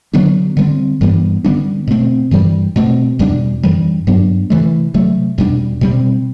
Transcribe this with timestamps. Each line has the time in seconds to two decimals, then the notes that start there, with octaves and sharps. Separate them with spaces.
0.13 D3 F#3 B3 D4
0.57 D3 G3 C4
1.01 G2 E3 G3 B3
1.44 D3 G3 B3 D4
1.88 B2 A3 C4
2.31 G2 E3 G3
2.76 B2 A3 C4
3.19 E2 B2 G3 D4
3.63 F#2 E3 G3
4.07 G2 F#3 B3 D4
4.50 C3 E3 A3
4.94 C3 F#3 A3
5.38 E2 B2 G3 D4
5.81 B2 G3 C4